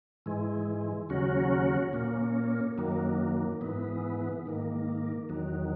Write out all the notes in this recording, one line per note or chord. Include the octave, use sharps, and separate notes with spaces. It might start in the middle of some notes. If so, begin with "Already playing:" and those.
G#2 E3 G#3
D#2 C#3 F#3 C#4 F#4
A#2 A#3 C#4
F#2 D#3 F#3 A#3
G#2 E3 B3
G#2 D#3 A#3
E2 D#3 F#3